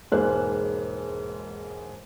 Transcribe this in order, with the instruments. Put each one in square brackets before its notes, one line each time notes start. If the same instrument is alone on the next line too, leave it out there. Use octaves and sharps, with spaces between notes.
[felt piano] E1 G#2 G#3 A#3 C5 F#6